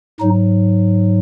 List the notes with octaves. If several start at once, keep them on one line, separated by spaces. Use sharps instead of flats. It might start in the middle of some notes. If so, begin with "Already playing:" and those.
G#2 F#3 D#4